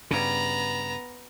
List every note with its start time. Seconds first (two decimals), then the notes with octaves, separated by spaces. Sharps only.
0.11 G2 C#3 B3 A#5